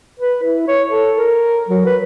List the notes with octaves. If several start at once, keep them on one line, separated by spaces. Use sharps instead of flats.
B4
E4
C#5
A4
A#4
F#3
B4